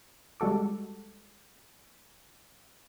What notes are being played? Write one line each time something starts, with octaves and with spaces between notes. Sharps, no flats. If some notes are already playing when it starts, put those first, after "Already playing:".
G3 G#3 F#4 A4 D6